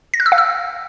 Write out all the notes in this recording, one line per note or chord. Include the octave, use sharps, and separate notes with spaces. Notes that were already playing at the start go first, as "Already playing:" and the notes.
A#6
F#6
E6
F5
E6